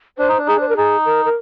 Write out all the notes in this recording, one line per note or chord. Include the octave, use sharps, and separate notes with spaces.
D4 C5
D#4
D4
D#4 G#4
D4 C5
A#4
D#4 G#4
A#4
A#4